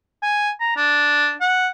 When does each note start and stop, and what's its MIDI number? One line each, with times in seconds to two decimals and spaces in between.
0.23 0.50 80
0.61 0.74 82
0.76 1.33 62
1.41 1.69 78